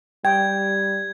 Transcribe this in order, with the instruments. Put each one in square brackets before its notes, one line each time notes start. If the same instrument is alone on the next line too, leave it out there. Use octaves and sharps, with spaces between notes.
[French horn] G3 [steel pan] G5 [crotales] G#6